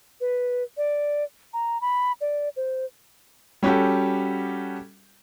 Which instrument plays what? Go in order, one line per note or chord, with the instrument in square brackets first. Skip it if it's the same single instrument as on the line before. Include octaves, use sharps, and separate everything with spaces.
[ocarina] B4
D5
A#5
B5
D5
C5
[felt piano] G3 C#4 F#4 G4 A4